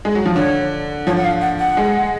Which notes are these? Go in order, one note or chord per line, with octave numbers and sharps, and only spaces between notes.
G#3
F#3
F3
D3 C#5
F3 C#5
F#5
F5
F#5
F#5
G#3